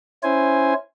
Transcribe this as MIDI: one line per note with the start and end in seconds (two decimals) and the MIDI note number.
0.23 0.74 61
0.23 0.74 64
0.23 0.74 72
0.23 0.74 80